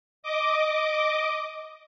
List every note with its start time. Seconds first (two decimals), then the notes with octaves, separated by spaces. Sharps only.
0.23 D#5 D6